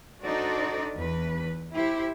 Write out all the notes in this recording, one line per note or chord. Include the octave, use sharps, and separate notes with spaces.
D4 D#4 F#4 A4 C5 D5
E2 B4
E4 G4 C5